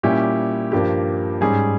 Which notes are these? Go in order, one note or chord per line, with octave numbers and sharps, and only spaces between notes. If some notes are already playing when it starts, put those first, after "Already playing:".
A#2 G3 C#4 E4 G4
G2 F3 A#3 G4
G#2 G3 C#4 G#4